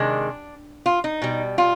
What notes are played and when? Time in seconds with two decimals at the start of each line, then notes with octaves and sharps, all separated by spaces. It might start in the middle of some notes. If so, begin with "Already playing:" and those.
Already playing: C3 D#3 G#3 D4
0.86 F4
1.04 D#4
1.22 B2 G3
1.58 F4